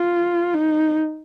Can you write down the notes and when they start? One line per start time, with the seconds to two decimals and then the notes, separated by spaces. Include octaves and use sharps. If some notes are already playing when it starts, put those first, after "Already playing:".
Already playing: F4
0.54 D#4